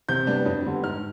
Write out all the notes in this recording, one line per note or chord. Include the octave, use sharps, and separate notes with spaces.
C3 G6
G3 B3 D4
F2
D3 G3 B3
G#2 F6